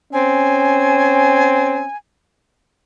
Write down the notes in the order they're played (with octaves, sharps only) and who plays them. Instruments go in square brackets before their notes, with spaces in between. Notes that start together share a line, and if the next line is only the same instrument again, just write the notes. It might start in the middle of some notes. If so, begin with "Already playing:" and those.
[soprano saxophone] C4 [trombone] C#4 [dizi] G#5